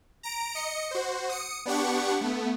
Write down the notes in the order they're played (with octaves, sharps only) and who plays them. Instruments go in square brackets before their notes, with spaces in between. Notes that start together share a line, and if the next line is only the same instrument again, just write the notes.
[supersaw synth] A#5 D7
D#5 C#7
F#4 C5
D#6 C#7
B3 D4 G4 F#5 C#6
A3 B3